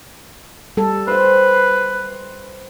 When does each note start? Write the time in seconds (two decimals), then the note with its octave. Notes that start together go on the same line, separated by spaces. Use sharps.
0.77 G3 A4
1.07 B4 C5 G5